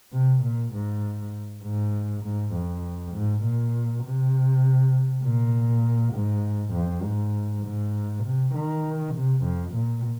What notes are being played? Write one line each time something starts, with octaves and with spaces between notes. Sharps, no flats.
C3
A#2
G#2
G#2
G#2
F2
G#2
A#2
C3
A#2
G#2
F2
G#2
G#2
C3
D#3
C3
F2
A#2